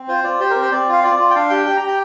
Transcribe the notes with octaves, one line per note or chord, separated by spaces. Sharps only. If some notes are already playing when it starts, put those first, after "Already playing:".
Already playing: C4
F4 C5
F4 D5
G4 C5
A#4
C4
C5
C4 D5
F4 F5
F4 D5
F4
G5
D4 F5
G4 G5
G4 G5
G4 A#5
G5